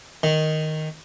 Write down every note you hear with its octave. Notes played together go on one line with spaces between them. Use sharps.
D#3